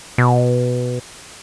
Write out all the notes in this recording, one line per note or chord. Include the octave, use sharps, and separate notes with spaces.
B2